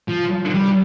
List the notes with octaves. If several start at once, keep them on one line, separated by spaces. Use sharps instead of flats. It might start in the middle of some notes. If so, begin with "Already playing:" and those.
F3
G3